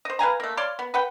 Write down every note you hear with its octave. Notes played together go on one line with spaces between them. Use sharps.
C5 D#5
B4 F5 G#5 A#5
A3 A#3
C#5 D5 F5 C6
B3
B4 F#5 G5